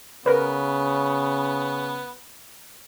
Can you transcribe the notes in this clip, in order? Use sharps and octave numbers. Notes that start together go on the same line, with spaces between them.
C#3 B3 A#4 B4